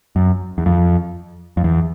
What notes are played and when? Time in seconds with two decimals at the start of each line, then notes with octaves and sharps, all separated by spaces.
0.16 F#2
0.58 E2
0.66 F2
1.57 F2
1.64 E2